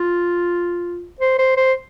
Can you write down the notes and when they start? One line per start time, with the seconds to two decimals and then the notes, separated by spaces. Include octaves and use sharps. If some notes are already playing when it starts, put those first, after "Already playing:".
Already playing: F4
1.20 C5
1.39 C5
1.57 C5